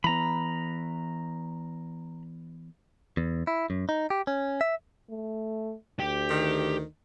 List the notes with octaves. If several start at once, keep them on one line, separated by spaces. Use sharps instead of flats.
E3 B3 A#5 B5
E2
E4
F#2
D#4
G4
C#4
E5
A3
D2 G4
D#3